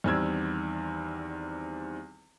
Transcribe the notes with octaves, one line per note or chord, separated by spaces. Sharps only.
E2 D#3 G3 C4 E6 G#6